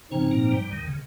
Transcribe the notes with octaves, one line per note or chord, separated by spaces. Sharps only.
G#2 C#3 F3 C4 C#4 D#4
A#2 A#3
G2 G3
D#2 D#3
C#3